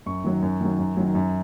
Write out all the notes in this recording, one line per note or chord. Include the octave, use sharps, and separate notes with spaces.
F#2 C#6
D#3 F#3
F#2
D#3 F#3
F#2
D#3 F#3
F#2